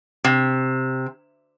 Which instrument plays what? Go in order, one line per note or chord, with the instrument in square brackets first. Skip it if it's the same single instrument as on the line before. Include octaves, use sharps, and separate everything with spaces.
[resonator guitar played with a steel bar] C3